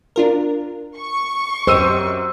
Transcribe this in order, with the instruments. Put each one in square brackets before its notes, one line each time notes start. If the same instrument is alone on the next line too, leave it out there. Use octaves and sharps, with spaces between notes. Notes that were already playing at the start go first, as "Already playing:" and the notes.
[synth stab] D4 F4 A#4
[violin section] C#6
[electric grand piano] F#2 E6 D#7 [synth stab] G4 D#5 [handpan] C5